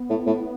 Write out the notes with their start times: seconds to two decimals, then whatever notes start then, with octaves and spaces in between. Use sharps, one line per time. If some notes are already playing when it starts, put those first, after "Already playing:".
Already playing: B3
0.10 A2
0.26 A2